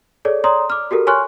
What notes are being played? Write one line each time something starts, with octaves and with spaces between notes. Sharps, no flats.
G#4 A4 C#5 D5
C#5 D5 A#5 C6 D#6
D6 F6
F#4 G4 A4 A#4
C#5 G#5 C6 C#6 F6 F#6